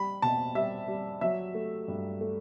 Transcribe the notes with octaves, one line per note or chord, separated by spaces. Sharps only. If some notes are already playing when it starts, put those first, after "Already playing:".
Already playing: G3 B5
B2 A5
G3 E5
G3
F#3 E5
A3
G2
A3